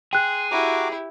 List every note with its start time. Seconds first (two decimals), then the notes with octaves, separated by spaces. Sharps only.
0.13 G#4 G5 C6 F#6
0.51 E4 F#4 G4 A#5 D6